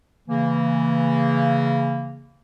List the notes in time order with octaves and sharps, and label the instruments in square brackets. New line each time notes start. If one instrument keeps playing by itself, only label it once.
[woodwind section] C#3 E3 A#3